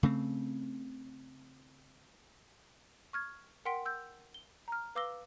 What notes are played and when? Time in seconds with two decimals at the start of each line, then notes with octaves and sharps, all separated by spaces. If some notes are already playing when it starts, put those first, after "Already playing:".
0.03 C#3 A3 C4
3.13 C#6 F6 G#6
3.65 A#4 F#5 G5 C6 B6 D7
3.86 E6 G6
4.34 G7
4.68 A#5 F6
4.95 B4 F5 D6 E6 A#6 G7